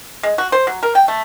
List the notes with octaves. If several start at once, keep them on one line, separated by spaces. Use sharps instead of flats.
G#3
F#4
C5
F#3
A#4
G5
A3